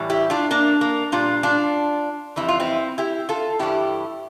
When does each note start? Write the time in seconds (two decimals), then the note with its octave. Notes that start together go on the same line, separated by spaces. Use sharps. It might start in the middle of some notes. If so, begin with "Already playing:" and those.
Already playing: A2 E3 G3
0.10 E4 G4
0.30 D4 F4
0.51 A#3 D4
0.81 A#3
1.12 A#2 G3 D4 F4
1.43 D4 F4
2.36 F2 E3 G3 E4
2.48 F4
2.60 C4 E4
2.98 E4 G4
3.29 F4 A4
3.59 G2 E3 G3 E4 G4